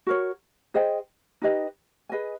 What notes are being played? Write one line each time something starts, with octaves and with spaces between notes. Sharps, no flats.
F#4 A#4 C#5
G#4 C5 D#5 G5
D#4 G4 B4 D#5
G#4 B4 D#5 G#5